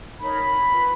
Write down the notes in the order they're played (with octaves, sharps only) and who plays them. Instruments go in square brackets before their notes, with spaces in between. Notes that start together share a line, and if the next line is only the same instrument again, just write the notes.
[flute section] D#4 A#4 C#5 B5
F4 B4